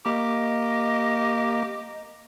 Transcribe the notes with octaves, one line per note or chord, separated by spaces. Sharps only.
A#3 G4 D#5